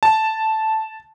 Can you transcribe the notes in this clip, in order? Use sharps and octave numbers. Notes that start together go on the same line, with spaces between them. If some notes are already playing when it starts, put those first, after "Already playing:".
A5